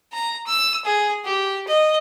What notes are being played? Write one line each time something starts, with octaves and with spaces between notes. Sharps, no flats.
A#5
E6
G#4
G4
D#5